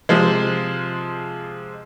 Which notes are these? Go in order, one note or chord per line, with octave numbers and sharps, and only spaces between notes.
C3 F3 G#3